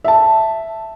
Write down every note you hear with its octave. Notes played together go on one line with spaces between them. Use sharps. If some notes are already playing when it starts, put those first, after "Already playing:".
E5 A5